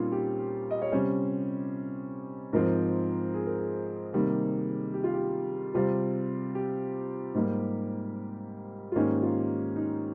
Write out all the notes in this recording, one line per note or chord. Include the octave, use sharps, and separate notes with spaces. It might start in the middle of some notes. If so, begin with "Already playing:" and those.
Already playing: A#2 G3 C4 C#4 D#4 F4
G4
D#5
C#5
C3 G3 C#4 C5
G#2 F3 C4 A#4
G#4
A#4
G#4
C3 D#3 G3 A#3
G4
F4
G4
C3 G3 C4 F4
G4
G#2 G3 A#3
F4
G#2 D#3 A#3 C#4 G4
F4
D#4